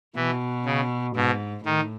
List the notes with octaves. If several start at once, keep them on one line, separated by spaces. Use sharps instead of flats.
B2 E3
C#3
G#2 B2
A2 D#3